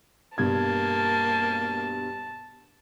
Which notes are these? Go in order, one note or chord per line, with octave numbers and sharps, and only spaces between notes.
G2 B2 A#3 A5 G#6